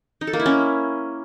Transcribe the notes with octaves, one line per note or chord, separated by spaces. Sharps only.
D#4
A4
A#3
E4
C#4